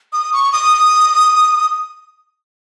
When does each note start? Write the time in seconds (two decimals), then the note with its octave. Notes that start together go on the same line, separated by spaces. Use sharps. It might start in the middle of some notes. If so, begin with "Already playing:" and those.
0.13 D#6
0.33 C#6
0.53 D#6